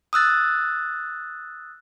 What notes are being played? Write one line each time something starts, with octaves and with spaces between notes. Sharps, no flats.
D#6 E6 F#6 A6